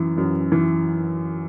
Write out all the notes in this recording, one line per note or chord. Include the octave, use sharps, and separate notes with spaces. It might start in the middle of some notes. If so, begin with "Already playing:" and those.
Already playing: F#2 E3
F#2
E3